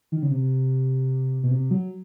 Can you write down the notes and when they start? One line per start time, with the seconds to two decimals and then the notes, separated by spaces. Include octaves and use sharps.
0.12 D#3
0.23 C#3
0.31 C3
1.43 B2
1.51 C3
1.71 F#3